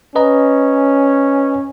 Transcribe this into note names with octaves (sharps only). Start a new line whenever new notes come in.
C#4 B4 D#5 A#5